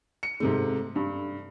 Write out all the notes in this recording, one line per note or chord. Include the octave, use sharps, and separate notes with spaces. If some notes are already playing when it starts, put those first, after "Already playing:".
C#7
G#2 C3 A3
G2